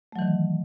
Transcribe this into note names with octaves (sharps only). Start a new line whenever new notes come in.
D#3 E3 F#3 A3